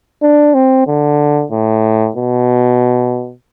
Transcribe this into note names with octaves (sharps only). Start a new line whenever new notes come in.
D4
C4
D3
A2
B2